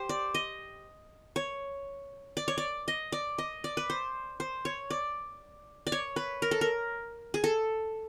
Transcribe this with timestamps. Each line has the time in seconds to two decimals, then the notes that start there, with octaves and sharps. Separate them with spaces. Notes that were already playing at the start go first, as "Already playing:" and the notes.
Already playing: G4 C5
0.09 D5
0.35 D#5
1.36 C#5
2.37 D5
2.48 C#5
2.58 D5
2.88 D#5
3.12 D5
3.38 D#5
3.64 D5
3.77 B4
3.90 C5
4.40 C5
4.65 C#5
4.90 D5
5.87 D5
5.92 C#5
6.16 B4
6.42 A#4
6.51 A4
6.61 A#4
7.34 G#4
7.44 A4